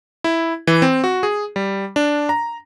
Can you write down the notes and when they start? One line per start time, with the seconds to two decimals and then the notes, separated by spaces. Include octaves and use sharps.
0.24 E4
0.67 E3
0.82 C4
1.04 F#4
1.23 G#4
1.56 G3
1.96 D4
2.29 A#5